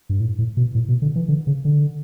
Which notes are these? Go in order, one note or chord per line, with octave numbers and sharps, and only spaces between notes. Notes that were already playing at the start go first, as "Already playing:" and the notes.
G2
A2
A2
B2
A2
B2
D3
E3
D3
C#3
D3